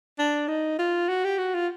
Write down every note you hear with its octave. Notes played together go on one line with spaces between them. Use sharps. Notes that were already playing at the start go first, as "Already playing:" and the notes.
D4
D#4
F4
F#4
G4
F#4
F4